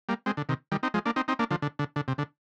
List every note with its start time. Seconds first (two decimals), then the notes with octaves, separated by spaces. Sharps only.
0.09 G3 A#3
0.26 G#3 C4
0.37 D3
0.49 C3 D#3
0.72 D#3 G3
0.83 C4 D#4
0.94 F3 G#3
1.06 A#3 D4
1.16 C4 D#4
1.28 C4 D#4
1.39 A#3 D4
1.51 D3 F3
1.62 D3
1.79 D3
1.96 D3
2.08 C3
2.18 D3